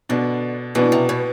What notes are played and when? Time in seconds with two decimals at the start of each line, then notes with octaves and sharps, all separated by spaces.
0.09 B2 D3 B3 D4
0.75 B2 E3 B3 D4
0.92 C3
1.09 B2